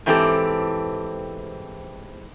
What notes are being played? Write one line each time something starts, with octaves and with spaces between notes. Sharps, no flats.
G#2 E3 C4 G4 A4